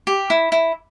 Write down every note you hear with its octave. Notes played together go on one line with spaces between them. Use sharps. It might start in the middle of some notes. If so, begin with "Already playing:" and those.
G4
E4
E4